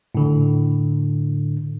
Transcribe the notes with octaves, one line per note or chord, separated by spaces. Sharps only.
A2 D3